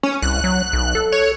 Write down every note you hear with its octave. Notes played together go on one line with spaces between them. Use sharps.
C#4
C2 F#6
F#3
B1
A4
C#5